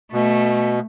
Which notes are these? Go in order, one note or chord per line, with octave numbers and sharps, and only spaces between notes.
B2 A3